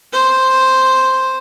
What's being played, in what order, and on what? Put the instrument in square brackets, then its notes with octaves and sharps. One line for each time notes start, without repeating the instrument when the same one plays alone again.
[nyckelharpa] C5